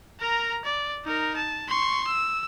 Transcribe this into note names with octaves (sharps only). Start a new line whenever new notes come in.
A#4 A#5
D5
D#4 A#4
A5
C6 C#6
E6